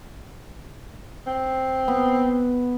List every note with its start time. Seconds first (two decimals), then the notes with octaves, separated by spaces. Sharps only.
1.27 C4
1.88 B3